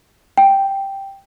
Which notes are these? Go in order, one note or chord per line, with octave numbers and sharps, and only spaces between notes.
G5